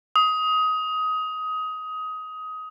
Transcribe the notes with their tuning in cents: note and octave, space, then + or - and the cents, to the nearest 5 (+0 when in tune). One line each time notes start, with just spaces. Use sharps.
D#6 +20